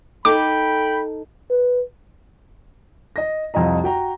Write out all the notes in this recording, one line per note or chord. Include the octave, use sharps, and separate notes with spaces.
D#4 A4 G5 B5 D6
B4
D#5 A#6
C2 F2 F4 D#5 A#5
F#4 G5 A#5